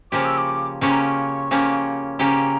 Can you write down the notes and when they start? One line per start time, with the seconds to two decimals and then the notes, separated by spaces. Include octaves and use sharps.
0.12 C#3 F3 A#3 C#4 G4 D6
0.25 E6
0.38 D6
0.81 C#3 F3 A#3 C#4 G4 C#6
0.91 A#5
1.00 C#6
1.51 C#3 F3 A#3 C#4 G4
2.19 C#3 F3 A#3 C#4 G4 A#5